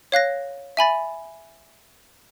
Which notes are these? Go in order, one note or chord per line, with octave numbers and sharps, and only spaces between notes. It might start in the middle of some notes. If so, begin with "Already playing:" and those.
C#5 F5 F#6 A#6
E5 G#5 B5 A6